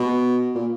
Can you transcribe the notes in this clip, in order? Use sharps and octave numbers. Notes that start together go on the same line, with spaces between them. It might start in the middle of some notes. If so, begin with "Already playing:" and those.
Already playing: B2
A#2